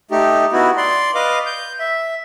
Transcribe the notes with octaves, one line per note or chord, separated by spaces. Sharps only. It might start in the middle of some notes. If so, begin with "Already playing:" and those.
A3 D#4 G4
B3 D#4 E4 F#4
D5 C6
B4 D#5 F5 D6
G6
E5